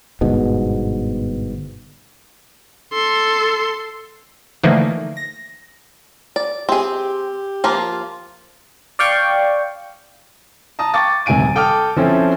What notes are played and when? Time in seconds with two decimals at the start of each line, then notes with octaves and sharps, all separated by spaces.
0.21 G1 G#2 B2
2.94 A4 C6
4.63 D3 E3 F3 A3 A#3 D#4
5.17 A#6
6.36 D5
6.69 C4 G4 G#4
7.64 F3 A#3 F4
8.99 D5 F5 G5 C#6
10.79 A5 A#5 D#6
10.94 G5 C#6 D6 A6
11.26 D#1 C3 G#5 D7 D#7
11.55 A4 G5 A5 D6 D#6 F6
11.96 F3 C4 C#4 E4 A4